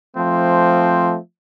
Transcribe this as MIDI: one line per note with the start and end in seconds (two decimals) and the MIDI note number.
0.16 1.16 53
0.16 1.16 57
0.16 1.16 60